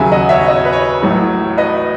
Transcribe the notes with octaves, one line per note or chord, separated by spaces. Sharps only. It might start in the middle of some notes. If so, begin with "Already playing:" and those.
Already playing: D#2 C#3 F#3 E5 G#5
D#5 F#5
C#5 E5
D#5
C#5
B4
C#5
A1 A2 F#3
B4 D#5